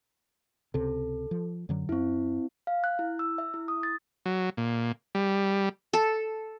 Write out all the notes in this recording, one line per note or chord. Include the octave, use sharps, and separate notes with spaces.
C#2 C3 A4
F3
F#2 D3 F#3
F#2 C4 E4
F5
F#6
E4
E6
E5
E4
D#6
A6
F#3
A#2
G3
A4